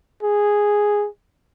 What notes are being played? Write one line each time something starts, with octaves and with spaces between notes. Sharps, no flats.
G#4